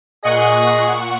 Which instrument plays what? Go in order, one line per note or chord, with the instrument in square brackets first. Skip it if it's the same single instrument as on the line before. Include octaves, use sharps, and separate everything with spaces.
[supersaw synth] A#2 F#5 C#6 [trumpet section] G#4 [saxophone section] D#5